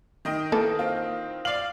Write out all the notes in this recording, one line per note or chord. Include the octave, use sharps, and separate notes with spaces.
D#3 D#5 G5
E3 A#3 A4
C4 F4
D5 F5 F#7